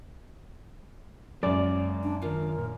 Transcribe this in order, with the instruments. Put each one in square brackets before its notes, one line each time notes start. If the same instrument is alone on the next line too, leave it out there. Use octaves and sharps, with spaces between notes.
[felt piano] F#2 [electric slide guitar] G#3 A#3 C#4 [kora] D5
[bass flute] D4
[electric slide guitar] D#3 F4 [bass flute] A#4
[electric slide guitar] A#2